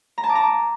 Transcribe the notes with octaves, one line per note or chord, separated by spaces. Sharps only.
A#5
A5
D6
A#5